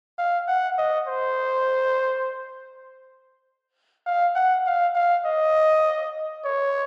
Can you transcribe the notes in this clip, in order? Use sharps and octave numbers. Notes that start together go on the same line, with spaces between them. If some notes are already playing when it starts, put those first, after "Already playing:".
F5
F#5
D#5
C5
F5
F#5
F5
F5
D#5
C#5